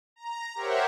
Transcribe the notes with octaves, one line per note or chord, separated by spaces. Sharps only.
A#5
G4 A#4 C5 C#5 E5 F#5